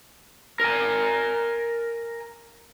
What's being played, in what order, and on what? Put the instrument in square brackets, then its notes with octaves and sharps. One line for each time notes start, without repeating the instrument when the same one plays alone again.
[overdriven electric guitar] A#4 G#5